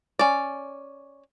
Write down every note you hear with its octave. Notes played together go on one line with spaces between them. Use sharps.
C#4 D5